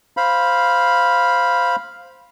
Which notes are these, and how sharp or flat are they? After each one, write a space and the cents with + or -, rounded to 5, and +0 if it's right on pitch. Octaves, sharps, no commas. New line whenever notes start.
C5 +0 F5 +0 B5 -10